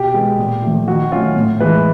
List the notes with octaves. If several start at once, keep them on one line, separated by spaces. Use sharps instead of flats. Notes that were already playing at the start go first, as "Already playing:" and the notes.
Already playing: B2 G4
G#3 B3
A#2
F3 A3
D#3 F#4
F#3 A3 C#4 F4
A2
E3 G#3 B4